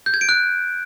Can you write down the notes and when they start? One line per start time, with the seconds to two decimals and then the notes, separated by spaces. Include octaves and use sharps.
0.06 G6
0.14 G#6
0.21 D7
0.29 F#6